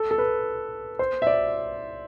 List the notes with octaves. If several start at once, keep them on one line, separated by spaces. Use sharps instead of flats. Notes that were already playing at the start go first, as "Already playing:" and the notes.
Already playing: A4
A4
B4
C5
E5
D5